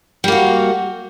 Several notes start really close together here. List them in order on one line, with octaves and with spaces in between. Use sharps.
G3 A#3 F#4